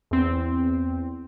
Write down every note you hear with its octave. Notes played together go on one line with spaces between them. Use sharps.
E2 C4